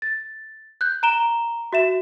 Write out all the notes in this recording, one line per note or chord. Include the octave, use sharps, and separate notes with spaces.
A6
F#6 G6
A#5 D7 E7 G7
F#4 E5 E7